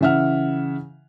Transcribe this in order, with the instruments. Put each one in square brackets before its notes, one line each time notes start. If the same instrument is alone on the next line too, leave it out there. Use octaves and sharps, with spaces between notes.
[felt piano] C#3 E3 E5 F#5 F6